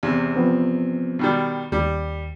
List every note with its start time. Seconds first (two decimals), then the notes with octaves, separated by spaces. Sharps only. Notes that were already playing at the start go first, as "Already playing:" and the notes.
0.03 E2 C3
0.36 F3 B3 C4
1.19 B2 D#3 G3
1.72 D#2 G3